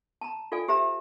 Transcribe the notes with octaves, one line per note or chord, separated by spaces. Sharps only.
A5 A#5
F4 A4 D5 F5 G#5
G4 C5 E5 A#5